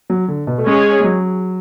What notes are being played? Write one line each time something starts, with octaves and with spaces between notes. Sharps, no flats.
F#3
D3
B2
A3
G#3 C#4 G#4 C#5
G#3
F#3